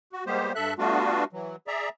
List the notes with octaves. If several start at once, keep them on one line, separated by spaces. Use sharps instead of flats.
F#4
G3 G#3 A#3 B3 G4 C5
G2 A4 E5 F#6
G3 A3 B3 D4 F4 F#4
E3 F#3
G#4 D5 E5 A#5